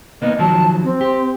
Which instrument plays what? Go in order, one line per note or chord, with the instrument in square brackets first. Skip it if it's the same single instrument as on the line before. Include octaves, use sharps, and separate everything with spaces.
[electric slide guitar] A#3 B3 D#4 [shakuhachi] D#5
[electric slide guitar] D#3 F3 F#3 [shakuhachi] A5
[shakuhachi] C4
[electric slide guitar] G4